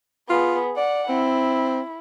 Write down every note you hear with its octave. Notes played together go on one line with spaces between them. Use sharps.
B3 F4 G#4
D5 F#5
C4 E4